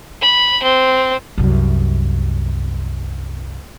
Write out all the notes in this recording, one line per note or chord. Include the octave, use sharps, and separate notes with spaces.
B5
C4
C2 F#2